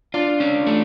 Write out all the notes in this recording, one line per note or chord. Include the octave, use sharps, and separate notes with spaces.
D4 F4
C#4
A3